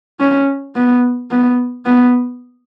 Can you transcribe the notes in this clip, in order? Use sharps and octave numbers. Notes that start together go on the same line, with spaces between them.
C#4
B3
B3
B3